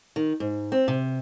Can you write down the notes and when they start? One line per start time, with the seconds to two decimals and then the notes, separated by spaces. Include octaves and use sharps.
0.16 D#3
0.40 G#2
0.72 C4
0.88 C3